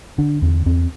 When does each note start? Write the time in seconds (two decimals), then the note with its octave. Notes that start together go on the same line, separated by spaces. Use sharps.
0.18 D3 D4
0.42 E2 C4
0.66 E2 C4